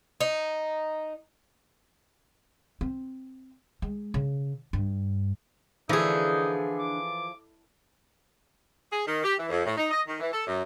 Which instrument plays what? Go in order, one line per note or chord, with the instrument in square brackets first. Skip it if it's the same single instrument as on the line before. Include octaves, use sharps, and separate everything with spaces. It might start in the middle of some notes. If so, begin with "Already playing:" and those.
[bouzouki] D#4
[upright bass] C4
G#3
C#3
G2
[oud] D3 [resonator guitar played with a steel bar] E3 [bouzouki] F3 G#4 [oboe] D#4
[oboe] D6
[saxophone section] G#4
D#3
G4
E3
F2
A2
D#4
D#5
D#3
E3
A4
F#2